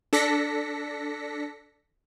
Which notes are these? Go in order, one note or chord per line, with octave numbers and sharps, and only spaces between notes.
D4 A4 A#6 B6 C#7